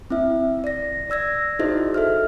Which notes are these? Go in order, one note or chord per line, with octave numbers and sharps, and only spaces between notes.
C4 E4 E5
D5 A#6
D5 E6 G#6 A#6
D#4 E4 F#4 G#4 C5 D#5
A4 E5 F6